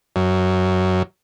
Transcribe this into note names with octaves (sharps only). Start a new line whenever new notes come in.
F#2